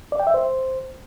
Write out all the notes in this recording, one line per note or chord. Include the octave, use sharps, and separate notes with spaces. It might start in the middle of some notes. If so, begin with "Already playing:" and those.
D5
G5
E5
C5